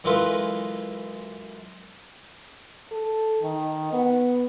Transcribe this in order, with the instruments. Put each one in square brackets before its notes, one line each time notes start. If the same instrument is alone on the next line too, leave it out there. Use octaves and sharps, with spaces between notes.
[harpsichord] F#2 E3 G#3 F4 A4 B4
[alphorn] A4
D#3
B3